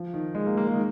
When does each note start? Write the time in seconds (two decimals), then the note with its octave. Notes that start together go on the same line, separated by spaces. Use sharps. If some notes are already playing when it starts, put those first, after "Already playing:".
Already playing: F3
0.14 D#3
0.35 G#3
0.46 A#3
0.57 A#3
0.67 G#3
0.74 D#3